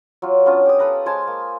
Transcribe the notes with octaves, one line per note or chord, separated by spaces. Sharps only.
F#3 F4
B3 C#4 D4 F4
G4 D#6
A4 B4 A#5
G#3 C5 G#5 A5
A#3